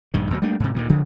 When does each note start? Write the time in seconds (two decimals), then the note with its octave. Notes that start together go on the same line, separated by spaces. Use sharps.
0.14 A#1 G2 D#3
0.31 D2 B2 D#3 F#3
0.42 G3 A3 A#3 D4
0.60 G#2 C3
0.74 D2 A#2 D#3
0.89 F1 D2 C#3 F3